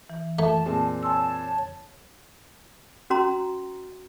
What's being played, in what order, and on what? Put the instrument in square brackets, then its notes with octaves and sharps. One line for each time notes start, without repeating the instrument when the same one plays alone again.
[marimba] E3
[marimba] F2 [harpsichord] A3 [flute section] A5
[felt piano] A#2 G#3 C4
[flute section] C#5 A5 [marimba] G#5 C6 E6
[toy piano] C#4 F#4 A#5 C6